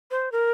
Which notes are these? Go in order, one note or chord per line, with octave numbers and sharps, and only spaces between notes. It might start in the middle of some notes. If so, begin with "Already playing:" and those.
C5
A#4